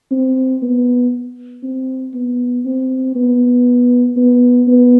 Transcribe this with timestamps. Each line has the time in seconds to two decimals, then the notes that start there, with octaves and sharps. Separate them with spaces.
0.11 C4
0.62 B3
1.63 C4
2.14 B3
2.65 C4
3.15 B3
4.17 B3
4.67 B3